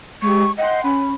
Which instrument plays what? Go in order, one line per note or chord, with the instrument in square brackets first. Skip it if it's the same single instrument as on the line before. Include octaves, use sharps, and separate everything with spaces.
[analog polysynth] G#3 G4 [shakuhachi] C#6
[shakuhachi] D#5 [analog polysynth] F#5 G5 C6
[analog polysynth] C#4 [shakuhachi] B5